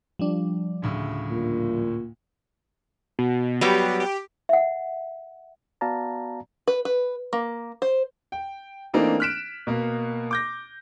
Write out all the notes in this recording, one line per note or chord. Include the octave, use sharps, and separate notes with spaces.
F3 G3 D4
D2 A2 C#3
A#2
B2
F#3 G3 B3 G4
G4
E5 F#5
B3 F#4 D5 F5 A5 A#5
B4
B4
A#3
C5
G5
E3 A3 A#3 C4 D4 D#4
F6 F#6 B6 D7 E7
B2 A#3
D6 G6 A#6